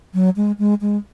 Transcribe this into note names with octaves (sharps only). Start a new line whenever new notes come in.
F#3
G#3
G#3
G#3